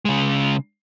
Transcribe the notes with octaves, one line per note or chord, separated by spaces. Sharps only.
C#3 G#3